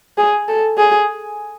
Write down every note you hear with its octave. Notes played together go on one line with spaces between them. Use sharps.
G#4
A4
G#4